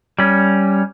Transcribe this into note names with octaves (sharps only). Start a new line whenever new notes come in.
G3 C#4